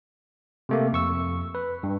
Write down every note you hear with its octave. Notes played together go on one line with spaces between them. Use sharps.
C3 A3 A#3
F2 C#6 E6
B4
G2